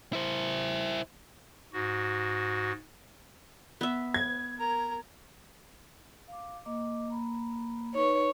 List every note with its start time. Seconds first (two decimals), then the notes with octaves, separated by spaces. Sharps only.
0.13 E4 C5
1.73 G#2 F#4
3.81 B3 E5
4.14 G#6
4.58 A#4 A#5
6.28 F5 D6
6.65 A#3 D#5 D6
7.08 A#3 A#5 B5
7.95 D#4 B4 C#5